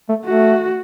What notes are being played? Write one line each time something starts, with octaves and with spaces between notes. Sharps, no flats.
A3
A3 F#4